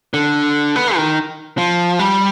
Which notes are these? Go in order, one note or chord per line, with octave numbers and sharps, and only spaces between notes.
D3
B3
D#3
F3
G3